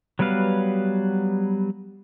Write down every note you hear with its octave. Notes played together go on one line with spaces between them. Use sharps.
F#3 G3 B3 B4 F5